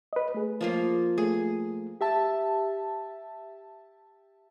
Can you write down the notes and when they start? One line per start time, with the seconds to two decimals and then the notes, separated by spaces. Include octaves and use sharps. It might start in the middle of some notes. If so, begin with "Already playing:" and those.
0.13 B4 D#5
0.34 A3 G#4
0.61 F3 A#3 F4
1.18 A3 G#4
2.01 G4 E5 A5